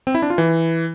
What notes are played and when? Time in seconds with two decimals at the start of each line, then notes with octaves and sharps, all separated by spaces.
0.07 C4
0.15 E4
0.22 D4
0.30 F4
0.38 E3